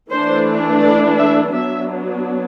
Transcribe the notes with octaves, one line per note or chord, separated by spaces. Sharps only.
E3 A3 D4 C5
D5
E5
F#3 B3 D4 E5